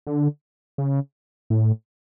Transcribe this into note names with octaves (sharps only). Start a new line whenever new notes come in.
D3
C#3
A2